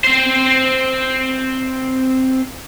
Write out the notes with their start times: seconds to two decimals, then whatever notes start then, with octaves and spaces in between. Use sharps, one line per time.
0.04 C4 C5